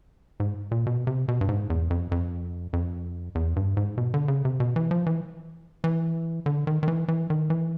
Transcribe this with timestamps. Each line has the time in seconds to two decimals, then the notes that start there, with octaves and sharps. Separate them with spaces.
0.40 G#2
0.71 A#2
0.87 B2
1.07 C3
1.28 B2
1.41 G2
1.49 G#2
1.70 E2
1.90 F2
2.11 F2
2.73 F2
3.35 E2
3.56 G2
3.77 G#2
3.98 B2
4.14 D3
4.28 C#3
4.45 C3
4.60 B2
4.76 E3
4.91 F3
5.06 E3
5.84 E3
6.46 D3
6.67 D#3
6.83 D#3
6.88 E3
7.08 E3
7.30 D#3
7.50 E3